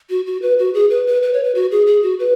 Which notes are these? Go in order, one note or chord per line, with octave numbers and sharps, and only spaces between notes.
F#4
F#4
B4
F#4
G#4
B4
B4
B4
C#5
B4
F#4
G#4
G#4
F#4
B4